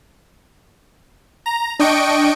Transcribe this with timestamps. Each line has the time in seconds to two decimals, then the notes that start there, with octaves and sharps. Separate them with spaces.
1.46 A#5
1.80 D4 D#5 G5 C#6 D7